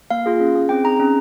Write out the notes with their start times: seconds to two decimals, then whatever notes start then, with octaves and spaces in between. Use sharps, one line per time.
0.11 A#3 F5
0.26 F4 G#4
0.40 C#4
0.55 G#4
0.69 C4 G5
0.84 D#4 G#4 A#5
1.00 C#4